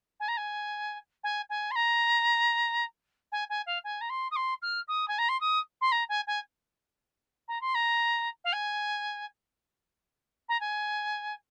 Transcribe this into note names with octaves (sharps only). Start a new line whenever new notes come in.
G#5
A#5
G#5
G#5
G#5
C6
A#5
G#5
G#5
F5
G#5
A#5
C6
D#6
C6
F6
D#6
G#5
A#5
C6
D#6
C6
A#5
G#5
G#5
A#5
C6
A#5
F5
G#5
A#5
G#5